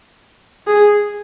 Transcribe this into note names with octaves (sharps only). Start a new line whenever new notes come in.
G#4